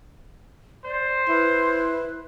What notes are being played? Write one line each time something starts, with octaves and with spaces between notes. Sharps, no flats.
C5 D5
E4 B4